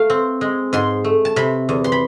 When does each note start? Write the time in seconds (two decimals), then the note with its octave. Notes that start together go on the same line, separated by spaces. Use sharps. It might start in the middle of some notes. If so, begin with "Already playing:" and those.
Already playing: A3 F5
0.10 C4
0.41 G#3
0.73 G#2 C6
1.04 A3
1.25 A5
1.36 C3 B5
1.69 E2
1.84 C6
1.92 B5